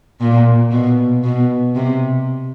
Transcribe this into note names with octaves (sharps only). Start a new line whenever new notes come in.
A#2
B2
B2
C3